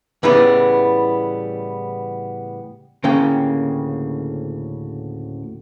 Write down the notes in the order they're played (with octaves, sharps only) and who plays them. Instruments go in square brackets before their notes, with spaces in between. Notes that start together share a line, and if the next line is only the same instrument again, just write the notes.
[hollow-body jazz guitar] A2 C#3 E3 G3 B3
D2 A2 C#3 A#3 C#4 G5